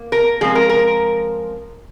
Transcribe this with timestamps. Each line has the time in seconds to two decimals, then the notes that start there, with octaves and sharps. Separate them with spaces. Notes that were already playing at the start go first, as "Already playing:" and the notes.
Already playing: A#3
0.12 A#4
0.41 F3 G#3 C4 G#4
0.55 A#4
0.69 A#4